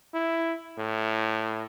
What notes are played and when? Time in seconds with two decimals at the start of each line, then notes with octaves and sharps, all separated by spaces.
0.14 E4
0.78 A2